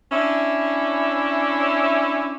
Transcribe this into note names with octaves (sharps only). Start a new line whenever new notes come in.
C#4 D4 E4 C#5 E5